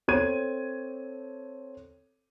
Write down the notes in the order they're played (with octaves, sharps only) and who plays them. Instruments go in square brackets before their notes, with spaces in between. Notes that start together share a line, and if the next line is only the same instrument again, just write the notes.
[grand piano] C4 A4 C#5 G#6 D#7